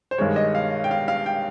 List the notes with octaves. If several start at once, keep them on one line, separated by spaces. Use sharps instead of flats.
C5
G2 D#3 G#3 C#5
D#5
F5
G5
F5
F5
G5